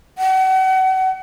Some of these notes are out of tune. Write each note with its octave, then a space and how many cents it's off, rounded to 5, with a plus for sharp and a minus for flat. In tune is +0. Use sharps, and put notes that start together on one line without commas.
F#5 +35